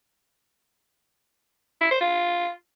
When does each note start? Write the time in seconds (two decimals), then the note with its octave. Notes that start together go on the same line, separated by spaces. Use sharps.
1.81 E4
1.91 C5
2.01 F4